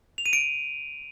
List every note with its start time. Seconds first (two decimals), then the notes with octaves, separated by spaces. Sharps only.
0.18 F7
0.26 D#7
0.33 D7